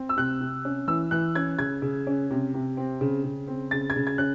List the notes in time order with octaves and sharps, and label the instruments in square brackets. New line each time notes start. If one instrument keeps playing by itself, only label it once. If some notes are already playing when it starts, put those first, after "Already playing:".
Already playing: [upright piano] C4
E6
C3 F#6
C3
C#4
E3 E6
E3 F#6
C#4 G#6
C#3 G#6
C#3
C#4
C3
C3
C4
C#3
C#3
C4
C#3 A6
G#6
C#3
G#6
C#4 F#6